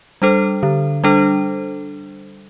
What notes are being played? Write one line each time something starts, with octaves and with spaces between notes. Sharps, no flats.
G3 D4 A4 C5
D3
G3 D4 A4 C5